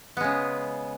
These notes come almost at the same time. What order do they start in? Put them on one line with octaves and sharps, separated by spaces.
B3 G#3 C#3